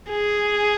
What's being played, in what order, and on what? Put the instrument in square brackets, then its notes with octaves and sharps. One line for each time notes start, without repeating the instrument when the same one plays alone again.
[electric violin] G#4